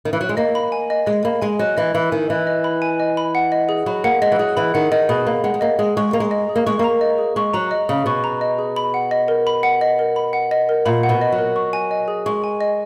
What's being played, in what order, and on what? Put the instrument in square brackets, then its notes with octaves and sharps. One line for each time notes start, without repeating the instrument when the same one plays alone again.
[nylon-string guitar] D#3
E3
F#3
G#3
[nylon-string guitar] A#3 [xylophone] D#5
[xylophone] B5
G#5
D#5
[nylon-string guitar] G#3 [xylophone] D#5
[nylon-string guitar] A#3 [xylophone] B5
[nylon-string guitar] G#3 [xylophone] G#5
[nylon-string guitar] F#3 [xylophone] D#5
[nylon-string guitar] E3 [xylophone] D#5
[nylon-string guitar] E3 [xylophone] B5
[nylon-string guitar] D#3 [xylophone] G#5
[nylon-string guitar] E3 [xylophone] D#5
[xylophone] D#5
B5
G#5
D#5
B5
F#5
D#5
G#4
[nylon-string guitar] F#3 [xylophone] B5
[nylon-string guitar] A#3 [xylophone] F#5
[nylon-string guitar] G#3 [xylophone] D#5
[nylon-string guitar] E3
[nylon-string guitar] F#3 [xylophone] G#4
[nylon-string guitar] E3 [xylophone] B5
[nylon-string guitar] D#3 [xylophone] F#5
[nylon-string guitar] D#3 [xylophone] D#5
[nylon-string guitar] B2 [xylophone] G#4
[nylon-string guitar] A#3 [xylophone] B5
[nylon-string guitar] G#3 [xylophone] F#5
[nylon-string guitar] G#3
[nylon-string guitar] A#3 [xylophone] D#5
[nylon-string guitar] G#3 [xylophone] G#4
[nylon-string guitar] G#3 [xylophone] C#6
[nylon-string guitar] A#3 [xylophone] A#5
[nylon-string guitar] G#3
[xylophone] D#5
G#4
[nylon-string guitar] A#3
[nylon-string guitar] G#3 [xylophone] C#6
[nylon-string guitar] A#3 [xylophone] A#5
[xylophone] D#5
G#4
[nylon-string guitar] G#3 [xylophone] C#6
[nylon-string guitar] F#3 [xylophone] A#5
[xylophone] D#5
[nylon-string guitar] C#3 [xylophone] G#4
[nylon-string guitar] B2 [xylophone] C#6
[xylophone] A#5
D#5
G#4
B5
F#5
D#5
A#4
B5
F#5
D#5
A#4
B5
F#5
D#5
A#4
[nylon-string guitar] A#2 [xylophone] B5
[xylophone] F#5
[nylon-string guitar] B2
[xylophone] D#5
[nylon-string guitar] F#3
[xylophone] A#4
C#6
G#5
D#5
G#4
[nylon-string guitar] G#3 [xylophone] C#6
[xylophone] G#5
D#5